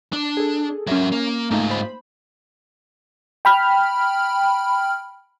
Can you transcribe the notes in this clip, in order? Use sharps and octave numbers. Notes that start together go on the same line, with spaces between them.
D4
G#4 A4
F#3 C#4 A#4 E5
A#3
G#2 A3 A#3 D#4 F4
C5 B5
G5 B5 F6